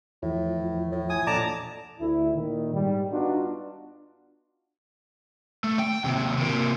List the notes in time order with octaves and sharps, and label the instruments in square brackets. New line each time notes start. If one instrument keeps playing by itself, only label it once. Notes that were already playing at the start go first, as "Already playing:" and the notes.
[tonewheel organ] E2 E3 F3 [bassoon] A2
[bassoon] A2
[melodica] G#5 D#6
[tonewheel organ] A#2 F3 D#5 [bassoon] D3 [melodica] A5 A#5 D6
[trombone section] D2 E4
A#2 D#3
G#2 G3
B3 D4 D#4 F4 F#4
[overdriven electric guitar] A3
G5
D#2 C3
C3 A#3